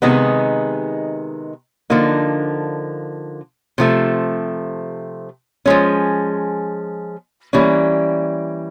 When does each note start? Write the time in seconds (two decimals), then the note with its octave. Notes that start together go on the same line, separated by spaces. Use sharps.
0.02 C3 D#3 G#3 B3 D#4
1.90 D3 F3 A#3 D#4
3.78 C3 F3 A3
5.66 F3 G#3 C#4
7.53 E3 G3 A#3 C#4